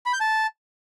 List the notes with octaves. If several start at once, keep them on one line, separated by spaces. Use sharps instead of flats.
B5
G6
A5